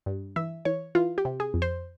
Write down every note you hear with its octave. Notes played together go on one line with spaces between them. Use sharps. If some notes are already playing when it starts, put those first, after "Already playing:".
G2
E3 E5
E3 C#5
E3 F4
G4
C3
G#4
F2
C5